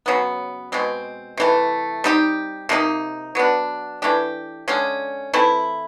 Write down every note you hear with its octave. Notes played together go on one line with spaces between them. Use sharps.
C#3 F#3 B3
B2 G#3 C4
C3 E3 A3
G3 C4 D#4 G4
C3 F3 A#3 D#4
F#3 B3 D4
E3 A3 D4 G4
D3 F3 G#3 C#4
E3 A3 C4 E4